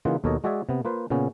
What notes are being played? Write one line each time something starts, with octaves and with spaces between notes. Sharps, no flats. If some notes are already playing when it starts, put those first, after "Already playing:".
C#3 E3 A#3 D#4 F4 F#5
D#2 B2 A4 A#4 C#5 D#5
G#3 F#4 G#4 D5 E5 G#5
C3 B3
A#3 F4 B4 C5
A#2 C#3 B3 C#4